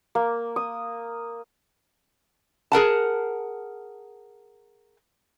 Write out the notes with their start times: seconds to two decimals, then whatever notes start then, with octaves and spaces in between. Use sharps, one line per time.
0.15 A#3
0.56 D#6
2.72 G#4 A#4 F#5 A5